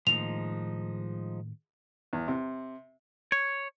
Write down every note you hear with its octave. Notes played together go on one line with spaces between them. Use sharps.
A2 D#3 F3 G#3 A#3 D#4 F7
E2
C3
C#5